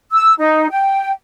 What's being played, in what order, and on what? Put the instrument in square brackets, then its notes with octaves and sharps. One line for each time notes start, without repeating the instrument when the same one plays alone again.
[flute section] E6
D#4
G5